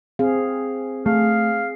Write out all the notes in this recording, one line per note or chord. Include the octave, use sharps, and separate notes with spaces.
C4 G#4 F5
A3 G#4 F5